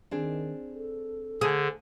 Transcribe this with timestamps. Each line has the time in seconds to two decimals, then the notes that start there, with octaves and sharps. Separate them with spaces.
0.11 D#3 C4 D4 G#4
0.74 A4
1.41 D3 G#4 C5 A5